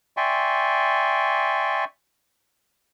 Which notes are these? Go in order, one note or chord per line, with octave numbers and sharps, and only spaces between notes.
D5 E5 G5 G#5 C6 C#6